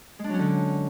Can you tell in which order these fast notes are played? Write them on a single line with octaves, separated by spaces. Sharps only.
G#3 D4 F#3 C#4 D3